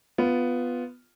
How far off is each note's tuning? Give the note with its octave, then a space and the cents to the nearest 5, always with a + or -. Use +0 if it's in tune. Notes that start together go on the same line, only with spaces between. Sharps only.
B3 +5 F4 +0